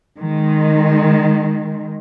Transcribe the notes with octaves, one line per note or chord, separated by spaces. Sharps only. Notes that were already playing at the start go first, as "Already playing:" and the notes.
D#3 G#3